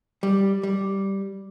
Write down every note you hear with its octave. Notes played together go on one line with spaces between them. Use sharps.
G3
G3